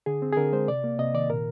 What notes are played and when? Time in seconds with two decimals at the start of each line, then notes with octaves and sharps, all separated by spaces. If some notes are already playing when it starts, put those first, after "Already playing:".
0.06 D3 G#4
0.22 C4
0.32 G#4
0.37 D3 A#4
0.52 G#3 C5
0.68 C3 D5
0.84 A#3
0.99 C3 D#5
1.14 D#3 D5
1.30 A#2 A#4